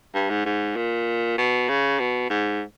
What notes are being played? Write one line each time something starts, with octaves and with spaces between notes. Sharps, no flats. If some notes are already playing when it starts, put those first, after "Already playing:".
G2
G#2
G#2
A#2
B2
C#3
B2
G#2